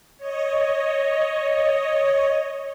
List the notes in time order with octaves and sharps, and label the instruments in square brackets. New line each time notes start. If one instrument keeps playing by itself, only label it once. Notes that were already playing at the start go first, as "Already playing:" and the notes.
[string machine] C#5 D#5